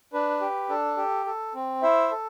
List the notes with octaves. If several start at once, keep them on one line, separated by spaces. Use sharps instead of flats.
D4 B4
G4
D4 A4
G4
A4
C4
E4 C5 E5
A4